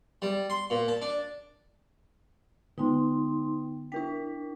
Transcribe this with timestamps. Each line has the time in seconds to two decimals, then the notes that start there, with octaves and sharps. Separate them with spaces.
0.22 G3
0.50 C6
0.70 A#2
0.88 A5
1.02 D4
2.78 D3 B3 D#4 G5 C6
3.92 D4 E4 A#4 G5 B6